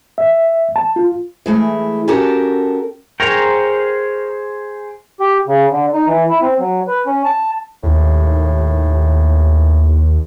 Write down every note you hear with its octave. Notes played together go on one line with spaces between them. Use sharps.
E5
A5
F4
E3 G#3 A3 E4
C#4 F#4 G4 A4 A#4 A5
G#4 A#4 C5 C#5 G5 A#5
G4
C#3
D3
D#4
E3
E4
C4
F#3
B4
C#4
A5
D#2 A2